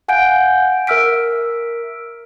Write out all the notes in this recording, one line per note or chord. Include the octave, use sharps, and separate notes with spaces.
F5 F#5 G#5 G6 D7
A#4 E5 E6 F6 B6 D7